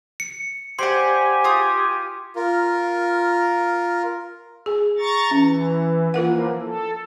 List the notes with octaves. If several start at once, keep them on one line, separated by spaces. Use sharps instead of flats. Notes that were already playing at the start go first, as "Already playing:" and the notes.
C#7
G4 C5 D5 F#5 G#5 C6
F4 D#6
F4 A#4
G#4
A#5 C#6 A6
E3 C#4
E3 F3 A#3 F4 A#4 F#5
A4